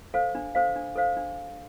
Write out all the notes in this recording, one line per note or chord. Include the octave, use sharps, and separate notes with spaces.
A4 C5 F5
D4
A4 C5 F5
D4
A4 C5 F5
D4